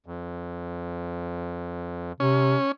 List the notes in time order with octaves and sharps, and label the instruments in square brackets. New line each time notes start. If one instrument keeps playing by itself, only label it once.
[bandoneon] F2
[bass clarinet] C3 [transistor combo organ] C#4